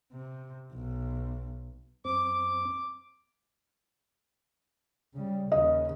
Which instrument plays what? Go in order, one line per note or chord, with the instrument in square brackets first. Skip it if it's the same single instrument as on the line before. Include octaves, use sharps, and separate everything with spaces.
[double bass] C3
B1
[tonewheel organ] F#2 C4 [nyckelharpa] D6
[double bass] C#3 G3
[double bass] D#2 C#3 [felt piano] D#5